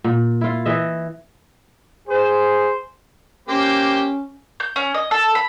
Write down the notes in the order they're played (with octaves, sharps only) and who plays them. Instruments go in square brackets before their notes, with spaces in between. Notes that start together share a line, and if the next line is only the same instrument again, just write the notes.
[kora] A#2
E4 F4
E3 D#5 E5
[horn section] G#4 C5
[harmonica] A#3 G4 C5 [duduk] C#4
[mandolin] G6
C#4
D#5
A4
B5